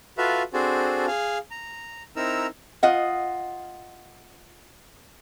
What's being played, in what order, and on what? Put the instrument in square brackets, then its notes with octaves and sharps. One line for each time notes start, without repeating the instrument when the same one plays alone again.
[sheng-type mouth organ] F4 F#4 A4 B4 E5 F5
C4 D4 F#4 G#4 A4 C5
G#4 F5
A#5
C4 D#4 E4 A#4 A#5 E6
[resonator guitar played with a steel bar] F4 D#5 F#5